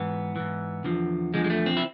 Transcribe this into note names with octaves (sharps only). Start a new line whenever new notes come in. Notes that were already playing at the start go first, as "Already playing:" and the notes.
Already playing: G#2 E3 B3
G#2 E3
E2 D3 F3
E2 D3 F3 G#3
G#3
A3
C4
E4